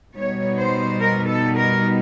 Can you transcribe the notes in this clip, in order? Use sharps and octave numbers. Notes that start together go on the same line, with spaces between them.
B2 G3 B3 D#4 C#5
C5
A#4
A4
A#4